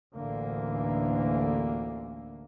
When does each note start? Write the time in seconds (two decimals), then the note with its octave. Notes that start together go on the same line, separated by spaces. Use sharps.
0.15 A1 D2 D3 E3 A#3